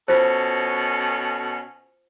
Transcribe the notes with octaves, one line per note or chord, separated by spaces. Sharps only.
B2 C#4 F4 A4 C5